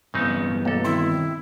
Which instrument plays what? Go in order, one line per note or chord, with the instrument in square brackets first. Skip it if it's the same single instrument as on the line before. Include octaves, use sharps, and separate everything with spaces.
[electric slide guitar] G2 E3 B3 [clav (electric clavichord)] C#3 C4 D#4
[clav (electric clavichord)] B1 A4 [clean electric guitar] A#3
[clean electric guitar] D#3 C4 C6 [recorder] E4